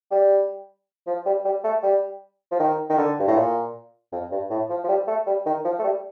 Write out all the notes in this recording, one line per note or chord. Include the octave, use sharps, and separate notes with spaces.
G3
F3
G3
G3
A3
G3
F3
D#3
D#3
D3
G2
A2
A#2
F2
G2
A2
F3
F3
G3
A3
G3
D#3
F3
A3
G3